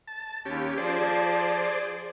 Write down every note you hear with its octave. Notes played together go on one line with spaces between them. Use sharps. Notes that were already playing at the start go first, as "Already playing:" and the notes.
A5
D#2 C#4 G4
F3 G#4 C5 D5